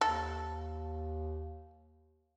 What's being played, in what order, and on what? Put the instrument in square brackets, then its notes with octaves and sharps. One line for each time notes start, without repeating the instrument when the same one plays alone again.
[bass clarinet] D#2 [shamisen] A4